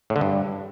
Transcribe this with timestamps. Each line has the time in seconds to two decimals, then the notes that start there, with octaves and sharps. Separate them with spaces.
0.10 A2
0.16 D3
0.21 G2